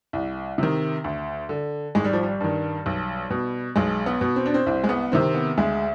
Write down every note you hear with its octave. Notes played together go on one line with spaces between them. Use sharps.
C2
C3 D#3
D2
D3
G#1 G#3
G3
F3
G3
G2 D#3
B1
B2
B1 G#3
B3
B2
C4
D4
C4
C2 C4
G#3
B3
C3 D#3 C4
B3
D2 G#3